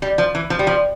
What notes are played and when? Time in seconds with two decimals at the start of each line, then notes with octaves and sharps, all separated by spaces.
0.02 G3
0.18 F3
0.35 E3
0.50 F3
0.59 G3
0.67 F3